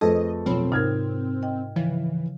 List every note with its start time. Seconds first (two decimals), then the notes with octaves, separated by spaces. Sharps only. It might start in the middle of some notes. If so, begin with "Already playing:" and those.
0.01 F2 A3 G#4 A4 B4 C5 D#5
0.46 B2 F3 F#3 C4 F4 C#5 B5
0.72 G#2 C3 D#4 A#4 F6 G#6
1.43 D#5 G5
1.76 C#3 E3 F3